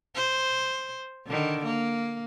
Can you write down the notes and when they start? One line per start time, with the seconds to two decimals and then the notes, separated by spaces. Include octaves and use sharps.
0.15 C5
1.27 D3 D#3
1.64 A#3